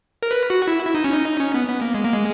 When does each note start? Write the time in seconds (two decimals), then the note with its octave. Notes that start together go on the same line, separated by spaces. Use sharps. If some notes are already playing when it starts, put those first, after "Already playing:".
0.23 A#4
0.31 B4
0.50 F#4
0.68 E4
0.85 E4
0.95 D#4
1.04 C#4
1.13 D#4
1.40 C#4
1.54 B3
1.68 B3
1.81 A#3
1.94 G#3
2.04 A#3
2.13 G#3